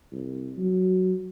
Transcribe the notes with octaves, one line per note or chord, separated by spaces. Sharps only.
C2
F#3